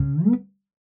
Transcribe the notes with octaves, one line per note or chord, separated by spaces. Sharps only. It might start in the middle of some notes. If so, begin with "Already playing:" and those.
Already playing: C#3
B3